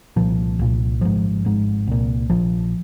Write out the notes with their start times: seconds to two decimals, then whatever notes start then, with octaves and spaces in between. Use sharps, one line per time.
0.16 C2 A#2 F3
0.59 C2 A#2
1.01 G#1 G#2 F3
1.45 G#1 G#2
1.87 C2 A#2
2.30 A#1 A#2 F3